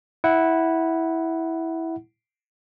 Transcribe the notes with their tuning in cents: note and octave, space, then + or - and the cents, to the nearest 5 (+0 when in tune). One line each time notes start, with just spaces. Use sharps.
E4 -10 F#5 +5